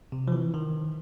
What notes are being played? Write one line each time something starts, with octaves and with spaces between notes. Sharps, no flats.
C3
F3
E3
D#3